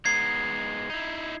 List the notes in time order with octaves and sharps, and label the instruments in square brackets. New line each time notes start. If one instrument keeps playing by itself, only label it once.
[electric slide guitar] G#3 B3 D#4 [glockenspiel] G#6 C7
[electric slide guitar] D#4 E4